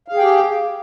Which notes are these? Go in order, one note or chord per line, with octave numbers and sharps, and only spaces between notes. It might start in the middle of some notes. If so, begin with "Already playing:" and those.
G4 G#4 F5 G5